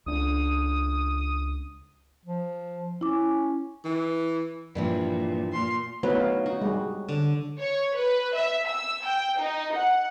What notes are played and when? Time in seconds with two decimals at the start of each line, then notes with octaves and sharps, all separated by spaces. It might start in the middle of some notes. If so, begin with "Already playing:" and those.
0.06 C#2 D4 D#6
2.26 F3
3.01 C#4 E4 D6
3.85 E3
4.75 G2 A#2 E3 F3
5.50 A#2 C6
6.03 F#3 A3 B3 B4
6.17 D#4 F5
6.46 D#4 F#4
6.62 G3 G#3
7.09 D3
7.58 C#5
7.96 B4
8.35 E5
8.68 E6
9.06 G5
9.39 D#4
9.75 F#5